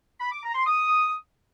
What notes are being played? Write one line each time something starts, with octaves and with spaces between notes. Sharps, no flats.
B5
D6
A#5
C6
D#6